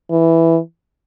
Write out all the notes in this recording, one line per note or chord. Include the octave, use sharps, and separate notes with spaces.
E3